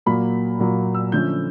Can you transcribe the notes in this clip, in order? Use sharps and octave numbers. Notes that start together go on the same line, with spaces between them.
A#2 F#3 A#3 B5
A#2 F#3 A#3
E6
D3 F3 A3 C#4 G6